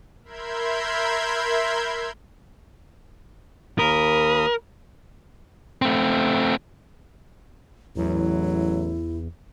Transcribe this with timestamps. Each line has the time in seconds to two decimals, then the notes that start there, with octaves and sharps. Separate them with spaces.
0.24 A#4 E5 B5 C6 G6 G#6
3.79 D#2 A#4 B5 D#6
5.82 A3 C4
7.96 A1 E2 F#3 E4